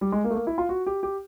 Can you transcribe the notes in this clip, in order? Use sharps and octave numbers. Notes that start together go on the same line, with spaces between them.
G3
G#3
A#3
A3
A#3
E4
F4
F#4
G4
G4